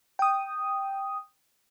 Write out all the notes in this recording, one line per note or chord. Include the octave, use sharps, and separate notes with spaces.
G5 D#6